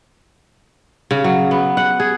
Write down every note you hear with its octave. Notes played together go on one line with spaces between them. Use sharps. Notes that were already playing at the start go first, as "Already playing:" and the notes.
C#3
F#3
B3
F#5
G#4